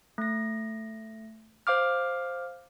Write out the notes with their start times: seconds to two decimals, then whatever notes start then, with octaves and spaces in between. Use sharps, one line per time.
0.18 A3 A#6
1.67 C5 F5 D6 F6